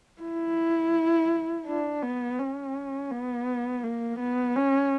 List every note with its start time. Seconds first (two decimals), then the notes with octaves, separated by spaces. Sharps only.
0.22 E4
1.66 D4
2.02 B3
2.39 C#4
3.11 B3
3.83 A#3
4.19 B3
4.56 C#4